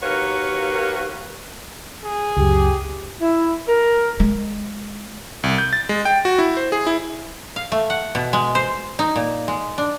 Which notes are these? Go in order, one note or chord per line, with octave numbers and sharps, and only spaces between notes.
D#2 A#3 F#4 A#4 B4 C#5
G#4
C#2 F#2 G4
E4
A#4
G#3
C2
G6
A6
G#3
G5
F#4
E4
C5
G#4
E4
F5
A3
F#5
B2
G#3
C5
D#4
A#2
G#3
D4